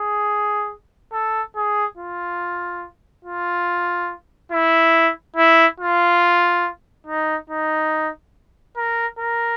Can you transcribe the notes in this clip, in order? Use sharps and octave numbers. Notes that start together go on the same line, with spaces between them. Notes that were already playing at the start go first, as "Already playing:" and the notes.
Already playing: G#4
A4
G#4
F4
F4
E4
E4
F4
D#4
D#4
A#4
A#4